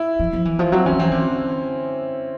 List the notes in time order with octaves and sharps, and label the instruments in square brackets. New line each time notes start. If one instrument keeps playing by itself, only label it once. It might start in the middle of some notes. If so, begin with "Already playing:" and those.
Already playing: [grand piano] E4
[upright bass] F3
F3
E3
F3
[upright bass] F#3 [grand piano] C4
[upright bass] E3 [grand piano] C#4
[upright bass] F3
[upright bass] E3 [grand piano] C4
[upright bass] D3